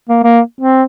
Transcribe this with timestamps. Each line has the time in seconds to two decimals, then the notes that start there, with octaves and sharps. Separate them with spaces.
0.09 A#3
0.24 A#3
0.61 C4